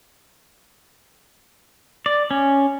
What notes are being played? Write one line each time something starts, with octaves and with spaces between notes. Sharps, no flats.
D5
C#4